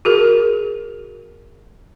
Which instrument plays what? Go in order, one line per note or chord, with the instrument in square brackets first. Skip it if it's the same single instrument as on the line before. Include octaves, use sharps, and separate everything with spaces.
[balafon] F#4 G#4 A#4